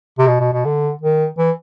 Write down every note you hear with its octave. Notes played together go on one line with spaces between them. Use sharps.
C3
B2
B2
B2
D3
D#3
E3